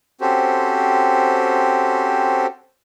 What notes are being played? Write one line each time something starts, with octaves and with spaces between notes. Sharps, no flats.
C4 C#4 F#4 G4 A4 C5